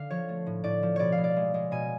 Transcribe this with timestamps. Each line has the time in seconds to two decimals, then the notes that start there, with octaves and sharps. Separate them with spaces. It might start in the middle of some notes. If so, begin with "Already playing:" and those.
Already playing: D3 F5
0.10 F3 C#5
0.29 A3
0.46 A2
0.64 A2 D5
0.83 F3
0.96 B2 C#5 D5
1.12 F5
1.18 B2
1.24 D5
1.36 G#3
1.54 G#3
1.71 B2 G#5